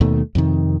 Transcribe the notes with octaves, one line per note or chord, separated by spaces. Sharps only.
D#2 B2 D#3 A3
F2 C3 D#3